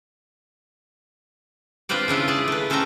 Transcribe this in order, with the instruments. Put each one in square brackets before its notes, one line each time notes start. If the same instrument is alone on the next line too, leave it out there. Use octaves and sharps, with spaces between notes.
[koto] C4 D4 F4 B4 C5 D5
C#3 D4 E4 F4
G#4 D5 A5
A3 B4
C#4 A4 C5 F5 G5 A#5